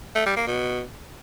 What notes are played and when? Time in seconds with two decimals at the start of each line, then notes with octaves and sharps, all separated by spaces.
0.15 A3
0.26 G3
0.37 A#3
0.47 B2